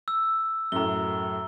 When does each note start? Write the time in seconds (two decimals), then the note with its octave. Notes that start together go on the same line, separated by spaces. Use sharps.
0.08 E6
0.72 F#2 A2 A#5 G7